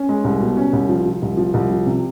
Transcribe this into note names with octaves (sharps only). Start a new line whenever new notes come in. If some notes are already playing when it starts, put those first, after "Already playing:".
Already playing: C#4
G#3
C2
B2
C#4
C2
F3
F3
C2
F3
C2
F3
C3